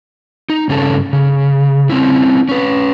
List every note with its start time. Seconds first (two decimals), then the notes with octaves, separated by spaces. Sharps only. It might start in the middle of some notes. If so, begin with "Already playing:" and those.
0.50 D#4
0.69 G2 C#3 C#4 A4 A5
1.13 C#3
1.90 C4 C#4 E4
2.49 C#4 B4